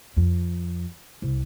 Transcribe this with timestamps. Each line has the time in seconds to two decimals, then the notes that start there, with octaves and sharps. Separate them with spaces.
0.17 F2
1.22 C2